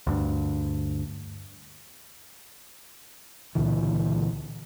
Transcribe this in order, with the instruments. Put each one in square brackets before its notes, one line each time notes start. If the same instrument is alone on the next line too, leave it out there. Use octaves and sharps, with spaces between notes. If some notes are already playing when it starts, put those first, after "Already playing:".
[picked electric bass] D2 G2
[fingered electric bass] C#2 A#2 D3 E3